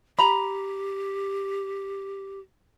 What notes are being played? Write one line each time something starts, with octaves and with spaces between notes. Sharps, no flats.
G4 A#5 B5